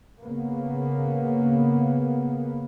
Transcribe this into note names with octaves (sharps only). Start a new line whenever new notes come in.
C#3 A#3 B3